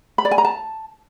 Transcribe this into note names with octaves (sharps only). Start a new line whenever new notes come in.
B5
D5
G#5
A#5
A5